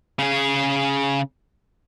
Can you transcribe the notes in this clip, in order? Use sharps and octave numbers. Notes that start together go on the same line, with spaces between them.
C#3 G#4